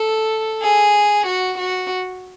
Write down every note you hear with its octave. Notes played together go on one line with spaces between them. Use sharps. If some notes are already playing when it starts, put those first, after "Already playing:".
Already playing: A4
G#4
F#4
F#4